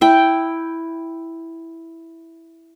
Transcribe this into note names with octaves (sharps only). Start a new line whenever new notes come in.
E4 G5